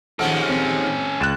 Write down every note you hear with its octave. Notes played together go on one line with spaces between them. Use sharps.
D#2 F3 G#3 C#4 A4 F#5 F6 D7
C4
C#2 F#6 A6 E7